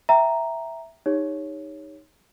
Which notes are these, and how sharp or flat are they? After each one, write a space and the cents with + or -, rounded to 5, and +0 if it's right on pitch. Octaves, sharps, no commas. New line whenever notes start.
E5 +0 G5 +0 A#5 +0
D#4 +0 G4 +40 C#5 +0